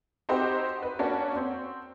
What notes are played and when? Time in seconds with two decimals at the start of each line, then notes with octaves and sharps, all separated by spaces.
0.29 C4 D#4 F#4 G4 C5
0.83 B4
0.99 A#3 C#4 D4 F#4
1.36 C4